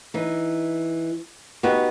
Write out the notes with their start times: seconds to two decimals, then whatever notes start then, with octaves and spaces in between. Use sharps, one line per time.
0.14 E3 D#4
1.63 B3 D#4 F#4 G4 B4